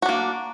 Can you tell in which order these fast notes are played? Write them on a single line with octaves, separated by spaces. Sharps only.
F#4 D4 A#3